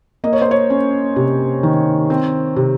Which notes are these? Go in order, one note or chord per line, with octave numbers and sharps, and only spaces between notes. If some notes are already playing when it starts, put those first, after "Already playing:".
A#3 D#5
C#5
C5
C#5
C#4
C3
D#3
C4
C3